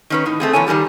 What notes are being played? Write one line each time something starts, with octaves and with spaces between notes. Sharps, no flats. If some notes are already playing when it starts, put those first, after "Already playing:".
D#3 C#4 B4
A2 D#4
A3 C4 G#4
A#2 E3 A4 C#5 G#5
D#3 G3 G#3 C#4 G4